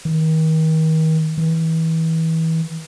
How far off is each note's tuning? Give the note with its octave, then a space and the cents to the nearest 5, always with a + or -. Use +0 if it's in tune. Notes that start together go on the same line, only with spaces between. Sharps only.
D#3 +35
E3 -30